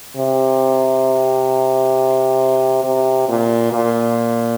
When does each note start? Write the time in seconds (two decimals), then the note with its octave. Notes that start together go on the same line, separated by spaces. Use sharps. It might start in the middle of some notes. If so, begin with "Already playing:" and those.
0.17 C3
2.84 C3
3.29 A#2
3.73 A#2